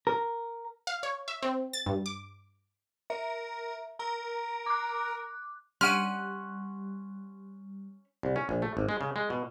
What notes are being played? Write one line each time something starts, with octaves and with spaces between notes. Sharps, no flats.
A#4
F5
C#5
E5
C4
A6
G2
D6
A#4 E5
A#4 A#5
D6 F#6
G3 C#4 F#5 C6 F6 D7 D#7
C2
C#4
A#1
A3
G#1
G#3
C#3
G#3
B2